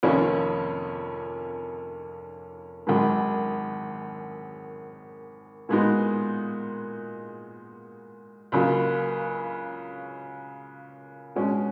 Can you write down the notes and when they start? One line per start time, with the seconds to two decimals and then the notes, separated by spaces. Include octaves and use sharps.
0.03 F1 F2 D#3 A#3 C#4
2.87 G#1 F#2 D#3 G#3
5.69 A#2 G#3 B3 D#4 F#4
8.52 C#2 C#3 F#3 A#3 F4
11.35 B2 G#3 C#4